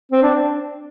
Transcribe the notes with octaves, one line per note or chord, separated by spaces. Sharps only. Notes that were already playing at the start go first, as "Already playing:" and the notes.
C4
D4